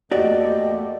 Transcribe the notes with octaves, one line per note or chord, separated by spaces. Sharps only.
E2 A3 A#3 F#4 G4 D5 D#5